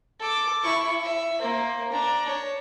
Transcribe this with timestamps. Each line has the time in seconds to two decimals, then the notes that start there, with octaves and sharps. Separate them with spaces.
0.20 A4 D6
0.63 E4 C#6
1.04 E5
1.40 A#3 C5
1.92 D4 A#5
2.28 C#5